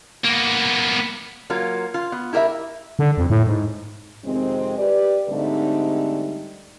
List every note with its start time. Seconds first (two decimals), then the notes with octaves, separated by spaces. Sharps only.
0.24 A#3 B3
1.50 F#3 A#3 F4 A#4
1.94 F4
2.12 B3
2.33 E4 G4 A#4 D#5 E5
2.99 D3
3.18 F2
3.30 A2
3.47 G#2
4.25 F2 C3 D#3 G#3 C4
4.78 G4 B4 D5
5.30 G#2 D3 G3 A3 C4 D#4